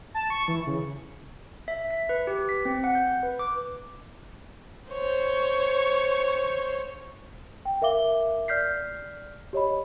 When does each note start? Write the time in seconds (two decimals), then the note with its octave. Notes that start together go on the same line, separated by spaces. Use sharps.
0.14 A5
0.30 C#6
0.48 E3
0.67 C#3
1.68 E5
1.91 B6
2.09 B4
2.27 G4
2.49 B6
2.65 C4
2.84 F#5
2.95 G6
3.23 B4
3.39 D6
4.90 C5 C#5
7.65 G5
7.82 A#4 E5 F5 D6 G7
8.48 D5 F6 G6 B6 C7
9.53 G4 C#5 D#5 B5